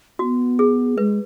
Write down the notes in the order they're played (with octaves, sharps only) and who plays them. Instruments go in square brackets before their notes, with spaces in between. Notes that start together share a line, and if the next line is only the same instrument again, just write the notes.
[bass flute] B3 [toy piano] F#4
[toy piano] G#4
[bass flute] G#3 [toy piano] B4